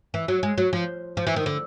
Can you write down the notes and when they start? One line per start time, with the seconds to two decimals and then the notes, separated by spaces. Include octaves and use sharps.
0.14 E3
0.28 F#3
0.43 G#3
0.58 F#3
0.73 F3
1.17 F3
1.27 E3
1.36 D#3
1.46 D3